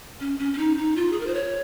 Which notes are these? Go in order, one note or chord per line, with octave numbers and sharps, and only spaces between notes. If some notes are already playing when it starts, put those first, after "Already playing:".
C#4
C#4
C#4
D#4
D#4
F4
G#4
A#4
C5
C#5